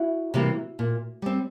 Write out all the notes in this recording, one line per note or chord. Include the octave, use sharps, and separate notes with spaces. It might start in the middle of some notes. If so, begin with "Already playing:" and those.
Already playing: E4 F#4
C3 E3 G3 A#3
A#2
G3 C4